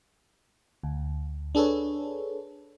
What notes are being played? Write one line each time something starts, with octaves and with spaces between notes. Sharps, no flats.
D2
D4 G#4 A4 B4 C#5